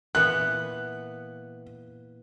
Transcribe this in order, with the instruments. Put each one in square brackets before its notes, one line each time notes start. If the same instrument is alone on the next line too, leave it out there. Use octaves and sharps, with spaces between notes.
[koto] A#2 E3 B3 [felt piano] F#6